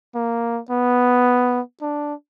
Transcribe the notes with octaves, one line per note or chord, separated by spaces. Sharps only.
A#3
B3
D4